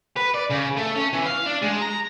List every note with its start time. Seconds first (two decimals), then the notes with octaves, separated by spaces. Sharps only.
0.17 B4
0.34 D5
0.50 C#3
0.77 A3
0.95 C#4
1.13 E3
1.26 F5
1.46 D4
1.63 G#3
1.82 A#5